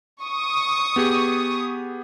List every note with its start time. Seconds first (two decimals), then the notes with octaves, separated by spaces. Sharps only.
0.22 C#6 D#6
0.96 B3 G4 G#4